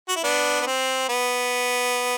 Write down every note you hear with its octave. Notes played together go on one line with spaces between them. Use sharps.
F#4
E4
B3 D4
B3
C4
B3